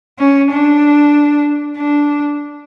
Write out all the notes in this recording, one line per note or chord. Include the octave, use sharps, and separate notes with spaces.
C#4
D4
D4